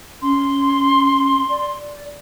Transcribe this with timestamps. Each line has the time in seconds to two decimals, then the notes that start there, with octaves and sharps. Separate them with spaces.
0.22 C#4 C6
1.50 D5